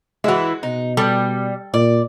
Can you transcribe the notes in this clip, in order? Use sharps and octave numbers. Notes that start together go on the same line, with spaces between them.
E3 G#3 E4 F#4
B2 D#4
G3 A4
A#2 D5